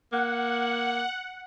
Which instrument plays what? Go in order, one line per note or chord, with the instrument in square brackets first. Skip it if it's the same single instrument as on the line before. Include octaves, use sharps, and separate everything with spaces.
[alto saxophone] A#3 [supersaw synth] F#5